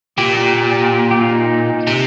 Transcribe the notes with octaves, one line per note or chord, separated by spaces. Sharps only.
A#2 G4
G4
G4
G4
F4
D#4
C3